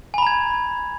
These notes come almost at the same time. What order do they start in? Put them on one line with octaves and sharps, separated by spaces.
G#5 B5 A#5 G#6